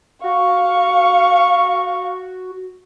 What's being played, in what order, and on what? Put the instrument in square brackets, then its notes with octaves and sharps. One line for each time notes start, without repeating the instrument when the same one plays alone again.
[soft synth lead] F#4 [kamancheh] F5 C#6